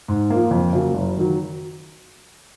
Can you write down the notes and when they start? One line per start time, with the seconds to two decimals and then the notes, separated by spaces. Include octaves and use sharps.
0.08 G#2
0.30 F3 A#3
0.51 F2
0.73 C#3 F#3 A#3
0.94 F#1
1.17 D#3 F#3